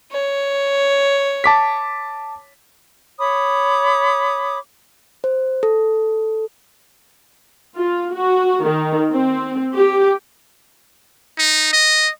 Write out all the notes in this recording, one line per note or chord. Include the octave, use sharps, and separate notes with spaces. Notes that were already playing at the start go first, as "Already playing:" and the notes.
C#5
A5 D6 B6
C#5 B5 D6 D#6
C5
A4
F4
F#4
D#3
C4
G4
D#4
D#5